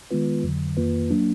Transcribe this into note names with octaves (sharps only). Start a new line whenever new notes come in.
D#3 G#3 B3 F4 B4
F2 D3 F#3
F2 D#3 A#3 F4 B4
F#3 A#3 D4